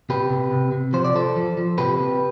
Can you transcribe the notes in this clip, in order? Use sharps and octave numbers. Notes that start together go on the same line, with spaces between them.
C3 G4 B4
C3
C3
C3
F3 C5
D5
F3 A4 C5
F3
F3
C3 G4 B4
C3